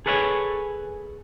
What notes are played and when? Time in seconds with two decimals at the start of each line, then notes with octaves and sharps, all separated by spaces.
0.06 G#4 A4 B4 C#5 E5 G#5